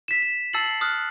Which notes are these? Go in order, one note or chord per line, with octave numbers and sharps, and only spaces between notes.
B6 E7
E7
A5 E6 A6 C7 C#7 F#7
D#6 F6 F#6